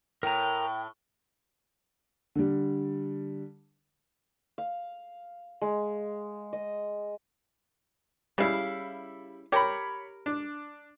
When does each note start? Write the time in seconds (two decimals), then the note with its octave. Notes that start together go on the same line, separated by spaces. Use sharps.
0.23 A2 A#4 G5 A#5
2.35 D3 G3
4.58 F5
5.61 G#3
6.53 D#5
8.38 C#3 G3 E4 F5
9.52 G4 A#4 C#5 B5
10.26 D4